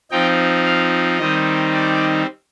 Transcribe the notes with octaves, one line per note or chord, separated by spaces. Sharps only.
F3 C4 D#4 G5
F5
D#3 G3 C4 D#4 D#5
D5